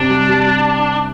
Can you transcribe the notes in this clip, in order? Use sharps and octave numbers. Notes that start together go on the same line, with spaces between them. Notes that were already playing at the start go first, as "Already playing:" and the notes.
Already playing: C3 D4
G3
G3
G3